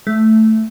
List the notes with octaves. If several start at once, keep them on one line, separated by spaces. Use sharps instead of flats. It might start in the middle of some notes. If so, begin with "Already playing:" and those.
A3